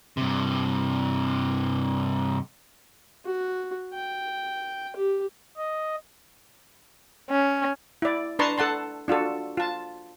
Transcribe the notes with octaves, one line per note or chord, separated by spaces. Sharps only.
G2 C3
F#4
G5
G4
D#5
C#4
E4 D5
D4 B4 A5 A#5 C6 C#6
A4 F#5 A5 C6
D4 F4 F#4 A4
F4 A5